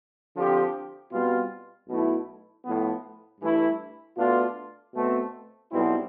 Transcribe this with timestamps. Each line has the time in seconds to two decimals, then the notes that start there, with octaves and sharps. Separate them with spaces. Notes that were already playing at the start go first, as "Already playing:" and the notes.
0.36 D3 F3 C4 G4
1.12 B2 G3 C4 F4
1.88 B1 B2 A3 E4
2.65 A2 F3 B3
3.41 G2 E3 A3 E4
4.17 B2 A3 D4 F4
4.94 B2 A3 C4
5.70 B1 B2 G3 C4 E4